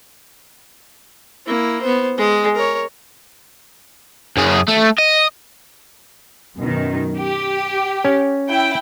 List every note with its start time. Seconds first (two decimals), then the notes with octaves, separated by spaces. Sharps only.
1.46 A#3 E4
1.82 B3 C5
2.18 G#3 G#4
2.55 A#4 C#5
4.37 F#2 G#4
4.68 A3
4.98 D#5
6.57 F#2 B2 D#3
7.18 G4
8.05 C#4
8.49 E4 G5